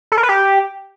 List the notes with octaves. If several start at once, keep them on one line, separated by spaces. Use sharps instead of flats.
A4
A#4
B4
G4